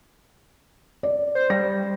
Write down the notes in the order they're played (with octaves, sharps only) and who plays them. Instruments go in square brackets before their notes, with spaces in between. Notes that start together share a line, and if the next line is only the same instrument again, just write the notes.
[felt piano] D5
[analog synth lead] C5
[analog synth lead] G3 [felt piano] A#6